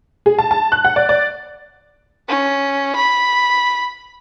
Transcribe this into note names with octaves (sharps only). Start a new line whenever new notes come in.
G#4
A5
A5
F#6
F#5
D5
D5
C#4
B5